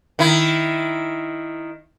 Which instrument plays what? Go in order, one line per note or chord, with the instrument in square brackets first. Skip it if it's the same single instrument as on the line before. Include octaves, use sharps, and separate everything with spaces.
[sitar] D#3 E4